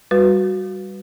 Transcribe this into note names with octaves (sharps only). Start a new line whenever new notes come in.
G3 F#4 B4